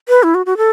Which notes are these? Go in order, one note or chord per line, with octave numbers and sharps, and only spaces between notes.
B4
E4
F#4
F#4
A4